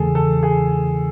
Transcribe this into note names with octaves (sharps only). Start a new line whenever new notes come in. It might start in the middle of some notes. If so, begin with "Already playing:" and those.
Already playing: E2 C#3 E3 A3 G#4 A4
A4
G#4